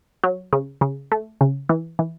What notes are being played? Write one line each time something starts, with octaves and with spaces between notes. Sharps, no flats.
F#3
C#3
C#3
A3
C#3
E3
E3